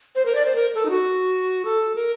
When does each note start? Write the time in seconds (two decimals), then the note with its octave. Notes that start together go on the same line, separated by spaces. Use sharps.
0.15 C5
0.26 A#4
0.35 D5
0.45 C5
0.55 A#4
0.75 A4
0.85 D#4
0.90 F#4
1.65 A4
1.95 A#4